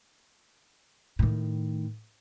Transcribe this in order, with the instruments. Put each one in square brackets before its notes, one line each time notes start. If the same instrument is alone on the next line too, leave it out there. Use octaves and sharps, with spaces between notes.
[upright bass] A2 D#3